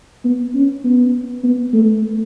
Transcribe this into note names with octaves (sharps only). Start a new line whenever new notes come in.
B3
C#4
B3
B3
A3